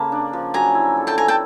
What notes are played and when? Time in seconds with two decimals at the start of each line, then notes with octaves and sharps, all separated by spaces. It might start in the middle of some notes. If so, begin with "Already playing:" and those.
Already playing: C#3 A#3 A5 B5
0.12 D4
0.33 F3
0.54 F#3 G#5 A#5
0.75 E4
0.97 A4
1.07 G5 A5
1.18 B3 G#5 A#5
1.28 G5 A5